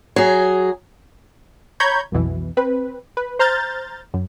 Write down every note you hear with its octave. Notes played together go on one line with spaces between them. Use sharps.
F#3 G#4
C#5 A#5 B5 C#6 G6 G#6
B1 F2 B2 E3
C4 B4
B4
C5 A#5 F6 G6 A6
F#2